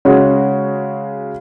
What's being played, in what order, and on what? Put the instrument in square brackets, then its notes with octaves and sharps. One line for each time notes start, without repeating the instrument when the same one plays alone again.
[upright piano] C#3 G#3 C#4 F#4